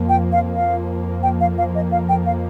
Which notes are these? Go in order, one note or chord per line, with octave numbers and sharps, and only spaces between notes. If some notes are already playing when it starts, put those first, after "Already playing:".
Already playing: F2 F3 A#3
G5
F5
F5
G5
F5
F5
D#5
F5
G5
F5